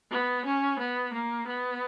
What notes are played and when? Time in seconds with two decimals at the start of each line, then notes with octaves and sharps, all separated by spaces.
0.11 B3
0.45 C#4
0.79 B3
1.13 A#3
1.47 B3